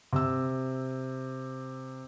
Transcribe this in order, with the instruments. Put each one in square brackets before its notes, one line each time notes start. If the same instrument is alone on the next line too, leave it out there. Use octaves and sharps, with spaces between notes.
[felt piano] C3 E6